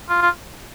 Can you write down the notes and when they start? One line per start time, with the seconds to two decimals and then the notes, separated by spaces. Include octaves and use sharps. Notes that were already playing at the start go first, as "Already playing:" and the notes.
0.09 F4
0.22 F4